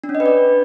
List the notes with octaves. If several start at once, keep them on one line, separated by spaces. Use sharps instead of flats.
D4
C#4
D#5
B4
D5